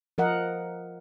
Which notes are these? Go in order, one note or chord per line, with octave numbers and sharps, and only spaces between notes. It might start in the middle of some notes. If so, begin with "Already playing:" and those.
F3 A#4 D#5 F#5